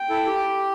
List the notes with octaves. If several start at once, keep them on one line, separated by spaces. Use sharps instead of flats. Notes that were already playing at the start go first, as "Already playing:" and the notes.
Already playing: G5
E4 A4
G4